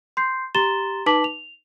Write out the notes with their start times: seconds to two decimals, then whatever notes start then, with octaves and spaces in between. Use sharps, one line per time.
0.17 C6 G6 C7
0.55 G4 A#5 C6 A6 E7 G7
1.06 D#4 B4 A5 D6 B6 F#7
1.24 F7